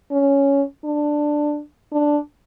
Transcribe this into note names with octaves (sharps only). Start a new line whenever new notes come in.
C#4
D4
D4